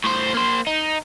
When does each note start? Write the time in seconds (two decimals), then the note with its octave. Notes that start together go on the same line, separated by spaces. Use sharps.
0.04 A2 C5
0.34 A#3 C5
0.67 D#4